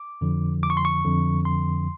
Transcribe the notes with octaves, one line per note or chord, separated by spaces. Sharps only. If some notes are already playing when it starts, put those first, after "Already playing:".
Already playing: D6
F2 D3 F3
D6
C#6
C6
C#6
F2 D3 F3
C6